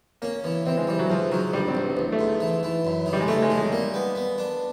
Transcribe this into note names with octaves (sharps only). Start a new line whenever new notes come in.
A#3 C#4
E3 B3
E3 C4
G#3
E3 G3
F#3
G#2 F3
D#3 F#3
A#1 G3
C4
A#1
B3
A1 B3
A3
G#2
E3
E3
F#2
D#3
G3
G#3
A3 C#4
G#3
D#3
G#3
G3 A#3
B3
B3
D4